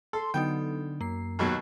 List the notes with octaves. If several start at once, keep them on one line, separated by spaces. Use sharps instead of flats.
A4 C6
D3 F#3 B3 D#4 G5
F#2 A#3 C7
D#2 B2 F#3